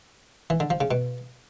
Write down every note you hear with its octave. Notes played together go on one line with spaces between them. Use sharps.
E3
D3
F3
C#3
B2